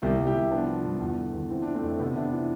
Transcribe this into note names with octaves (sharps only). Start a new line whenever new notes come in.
C2 E4 G4
C2
E4 G4
C2
F3 B3 D4
F3
G2
E2
D3
E2
E3 C4
E3 D4
A3 C4
F2
C3 B3
C3 B3 D4
E3